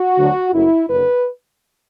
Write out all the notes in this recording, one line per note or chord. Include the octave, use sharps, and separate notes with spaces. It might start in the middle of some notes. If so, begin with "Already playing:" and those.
Already playing: F#4
D2 D3 F#3 D4
F#1 F#2 F#3 A3 E4
F#1 F#2 D3 B4